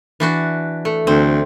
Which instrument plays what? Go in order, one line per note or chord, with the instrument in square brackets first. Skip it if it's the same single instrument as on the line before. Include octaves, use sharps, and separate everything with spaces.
[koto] E3 D4 F#4
A3
[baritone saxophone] D2 [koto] C4